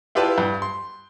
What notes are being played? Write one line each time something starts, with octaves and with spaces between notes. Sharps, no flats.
E4 F4 G4 B4 D5 A5
G2
C6